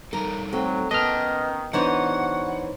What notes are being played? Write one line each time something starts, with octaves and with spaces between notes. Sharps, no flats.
G3 D#4 A4 A#4
F#3 A3 C4
D#3 B3 C#4 D#5 A5 F6
E3 B3 D4 D#4 F#4 C5 C#5 F#5